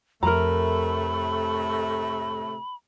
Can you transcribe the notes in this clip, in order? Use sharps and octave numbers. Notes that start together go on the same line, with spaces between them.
F2 A2 C3 A3 A#4 A#5 B5